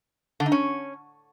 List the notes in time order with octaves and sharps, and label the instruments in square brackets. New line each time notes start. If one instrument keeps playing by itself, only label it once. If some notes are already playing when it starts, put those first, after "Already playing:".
[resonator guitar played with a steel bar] D3
D#4
C#4